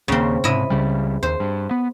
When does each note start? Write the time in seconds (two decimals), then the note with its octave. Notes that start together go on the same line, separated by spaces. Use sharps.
0.08 D#1 D#2 C#3 A#3 C4
0.44 G#2 C3 E4 D#5
0.70 C#2 C#3 G3
1.23 D#2 C5
1.40 G2
1.71 B3